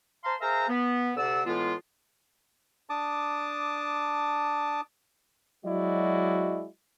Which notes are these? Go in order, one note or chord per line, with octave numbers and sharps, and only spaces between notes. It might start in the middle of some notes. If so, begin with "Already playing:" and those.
C5 F5 A5 A#5 C6
G#4 A#4 C5 E5 F5 A#5
B3
D2 C3 D5 F#5 E6
A2 E3 G#3 B3 F4
D4 A5 D6 D#6
F#3 G#3 E4 F#4 D5 D#5